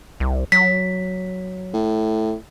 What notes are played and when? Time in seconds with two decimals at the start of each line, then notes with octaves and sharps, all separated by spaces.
0.20 C2
0.52 F#3 B6
1.73 A2